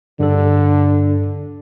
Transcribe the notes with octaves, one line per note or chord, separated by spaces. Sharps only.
G2 D3 A4